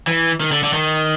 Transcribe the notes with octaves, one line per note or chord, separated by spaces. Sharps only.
E3
D#3
D3
D3
D#3